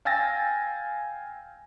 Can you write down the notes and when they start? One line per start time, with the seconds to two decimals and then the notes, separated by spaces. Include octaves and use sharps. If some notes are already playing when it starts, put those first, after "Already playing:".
0.05 F5 G5 G#5 E6 A6 A#6